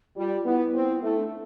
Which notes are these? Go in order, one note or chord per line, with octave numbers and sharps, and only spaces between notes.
G3 F4
B3 E4
C4
A3 E4
D4